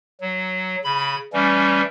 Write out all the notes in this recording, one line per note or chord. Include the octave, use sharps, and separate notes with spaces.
F#3
C#3 B5
E3 G3 A3 C#4